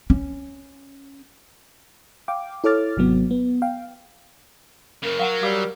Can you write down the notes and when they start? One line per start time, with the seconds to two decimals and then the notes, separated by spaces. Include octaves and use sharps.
0.10 C#4
2.28 F5 G5 D6
2.64 E4 A4 C#5 D6 F6 A6
2.97 G#1 C3 F#3 B3
3.31 B3
3.62 F5 G5
5.03 F#2 C#3 A#4
5.19 F#3 F5 F#5 A#5
5.43 G3 F5 D6 E6